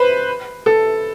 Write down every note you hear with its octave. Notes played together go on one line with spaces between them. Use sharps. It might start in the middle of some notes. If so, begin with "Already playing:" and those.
Already playing: B4 C5
A4